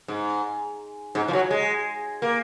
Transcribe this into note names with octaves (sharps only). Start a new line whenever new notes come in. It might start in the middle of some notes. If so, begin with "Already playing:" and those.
G#2
G#2
F3
F#3
G#3
A#3